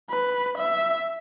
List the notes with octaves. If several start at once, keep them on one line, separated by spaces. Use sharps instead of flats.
B4
E5